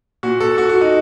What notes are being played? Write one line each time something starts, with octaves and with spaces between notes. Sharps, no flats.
A#2 F#4
A4
F#4
F#4
D#4